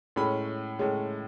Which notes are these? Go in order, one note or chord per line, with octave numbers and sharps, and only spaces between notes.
A2 G#3 C#4 B5
A2 G#3 C#4